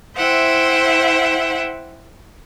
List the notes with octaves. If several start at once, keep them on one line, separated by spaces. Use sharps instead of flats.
E4 C5 E5 F#5 G5